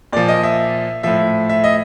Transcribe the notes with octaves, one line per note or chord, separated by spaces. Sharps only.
A#2 F3 D5
D#5
E5
A2 F3 E5
E5
D#5